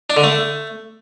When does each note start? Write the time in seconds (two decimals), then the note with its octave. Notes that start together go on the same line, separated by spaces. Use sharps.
0.10 D4
0.17 D3
0.24 A3